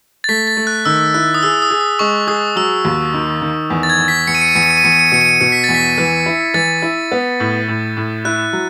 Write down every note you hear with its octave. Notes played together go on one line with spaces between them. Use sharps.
A6
A3 B6
A6
A3
F#6
D#3 E6
E4 F#6
D#6
G#4 E6
D#6
G#4
D#6
G#3 C#6
G#4 D#6
F#3 E6
D#2
D#3
D#3
E2
A6
G#6
E2
B6
E2 C#7
D#7
C#7
D#7
E2 C#7
D#7
C#7
D#7
E2 C#7
D#7
C#7
D#7
B2 C#7
D#7
C#7
B2 C#7
B6
E2 A6
B6
E3
E4
E3 A6
E4
B3
A2
A2
A2
E4 F#6
F#3